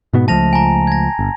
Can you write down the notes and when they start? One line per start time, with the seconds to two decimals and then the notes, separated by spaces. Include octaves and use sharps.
0.13 G#2 B2 B3
0.28 C#2 F3 A3 A5 A#6 F7
0.53 G#5 A#5
0.87 G#6 A#6
1.19 G1